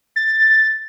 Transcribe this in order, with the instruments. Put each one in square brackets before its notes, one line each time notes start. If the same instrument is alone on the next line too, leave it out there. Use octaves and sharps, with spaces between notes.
[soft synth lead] A6